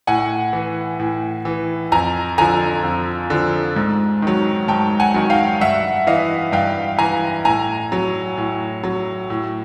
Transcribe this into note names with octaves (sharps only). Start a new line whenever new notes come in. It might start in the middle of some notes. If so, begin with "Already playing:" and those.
A2 F#5 G#5
E3
A2
E3
F2 G#5 A#5
D3 F3 G#5 A#5
F2
D3 F3
G#2
D#3 F#3
G#2 G5 A5
F#5 G#5
D#3 F#3
F5 G5
G2 E5 F#5
E3 D#5 F5
G2 F5 G5
E3 G#5 A#5
A2 G#5 A#5
F#3
A2
F#3
A2